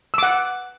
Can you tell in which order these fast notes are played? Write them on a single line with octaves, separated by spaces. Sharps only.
E6 D6 F#5